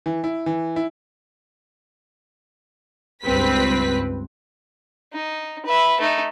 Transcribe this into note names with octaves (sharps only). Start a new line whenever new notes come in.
E3
E4
E3
E4
C#2 G2 C4 B4 B6
D#4
B4 E5
A3 D#4